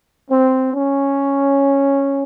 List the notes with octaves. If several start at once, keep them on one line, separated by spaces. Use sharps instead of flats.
C4
C#4